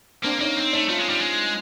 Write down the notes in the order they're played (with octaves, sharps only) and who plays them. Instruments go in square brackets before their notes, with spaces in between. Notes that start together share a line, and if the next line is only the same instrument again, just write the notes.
[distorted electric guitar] A#3 [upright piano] C4 D4
[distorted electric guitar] A#3 [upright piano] C#4 D#4
[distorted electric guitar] C4
[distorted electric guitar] A3 [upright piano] C#4 D#4
[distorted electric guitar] A3 [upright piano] D#4 F4
[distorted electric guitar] G#3
G3
G#3